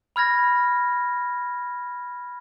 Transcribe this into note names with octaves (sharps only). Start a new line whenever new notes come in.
B5 F6 G#6 A#6